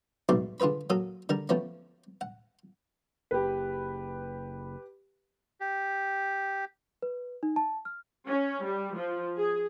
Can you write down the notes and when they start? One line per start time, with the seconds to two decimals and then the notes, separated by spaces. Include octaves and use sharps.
0.29 B1 G#2 B2 G3 A3 D6
0.60 D3 F4 G#4 B4 B5
0.90 F#3 A#3 A4 D#6
1.29 D3 G3 A#4
1.49 F3 A3 B3 C#4
2.21 F#5
3.31 F#1 G4 B4
5.61 G4
7.02 B4
7.43 D#4
7.56 A5
7.85 F6
8.27 C#4
8.64 G3
8.96 F3
9.38 G#4